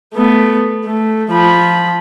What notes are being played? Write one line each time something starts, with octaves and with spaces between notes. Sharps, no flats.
A3 B3
A3
F3 B5